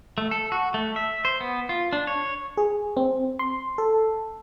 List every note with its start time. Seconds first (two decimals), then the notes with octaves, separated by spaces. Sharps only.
0.18 A3
0.31 A4
0.52 F#4
0.74 A3
0.96 E5
1.25 C5
1.40 B3
1.69 F4
1.93 D4
2.07 C#5
2.57 G#4
2.97 C4
3.39 C6
3.78 A4